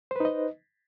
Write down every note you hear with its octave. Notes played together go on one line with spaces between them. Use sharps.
D#4 B4 C5 D#5